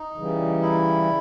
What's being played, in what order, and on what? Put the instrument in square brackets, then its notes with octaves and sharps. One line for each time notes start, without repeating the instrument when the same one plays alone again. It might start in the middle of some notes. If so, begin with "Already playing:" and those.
Already playing: [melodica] D#4
[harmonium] C#3 E3 G3
[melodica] E4